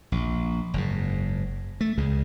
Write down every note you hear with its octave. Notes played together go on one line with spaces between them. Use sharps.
A#1
F#1 G#2
A3
C#2 C#3 G#3